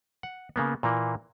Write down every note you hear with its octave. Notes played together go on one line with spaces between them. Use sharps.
F#5
C#3 A#3 B3
A#2 E3 A#3